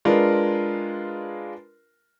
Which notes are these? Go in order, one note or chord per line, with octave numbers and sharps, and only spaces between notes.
G#3 D4 F4 A#4 B4